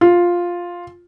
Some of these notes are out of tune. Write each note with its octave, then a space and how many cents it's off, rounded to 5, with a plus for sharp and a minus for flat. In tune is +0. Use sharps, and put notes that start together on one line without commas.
F4 +5